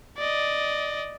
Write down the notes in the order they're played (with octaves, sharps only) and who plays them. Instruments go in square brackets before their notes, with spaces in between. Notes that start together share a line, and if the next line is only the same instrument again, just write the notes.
[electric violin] D5 D#5